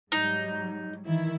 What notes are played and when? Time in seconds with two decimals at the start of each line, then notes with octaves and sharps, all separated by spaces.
0.12 G#2 F#3 G3 D#4
1.06 D#3 E3 E4